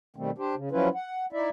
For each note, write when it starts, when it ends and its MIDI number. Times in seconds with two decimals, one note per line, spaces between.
0.16 0.31 47
0.16 0.31 51
0.16 0.31 55
0.16 0.31 57
0.16 0.31 60
0.38 0.55 62
0.38 0.55 67
0.38 0.55 72
0.55 0.69 49
0.71 0.89 53
0.71 0.89 54
0.71 0.89 61
0.71 0.89 64
0.71 0.89 65
0.71 0.89 71
0.95 1.26 78
1.32 1.50 63
1.32 1.50 64
1.32 1.50 74
1.32 1.50 76